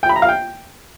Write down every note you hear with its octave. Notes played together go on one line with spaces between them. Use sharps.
G5
B5
A#5
F5
G5